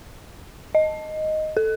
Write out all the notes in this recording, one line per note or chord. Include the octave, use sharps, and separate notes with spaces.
D#5
A4